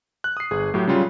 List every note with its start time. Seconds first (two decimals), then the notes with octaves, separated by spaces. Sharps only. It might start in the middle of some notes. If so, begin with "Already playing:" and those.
0.24 F#6
0.37 D#6 C7
0.51 G1 G#4
0.74 A2 F#3 G4
0.87 C#3 F#3 G3 F4